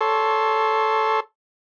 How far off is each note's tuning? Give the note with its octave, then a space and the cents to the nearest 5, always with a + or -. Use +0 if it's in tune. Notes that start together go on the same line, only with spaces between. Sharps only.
A4 -5 C#5 +15 C6 +15